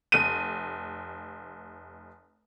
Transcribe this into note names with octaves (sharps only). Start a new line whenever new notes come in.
F1 D#7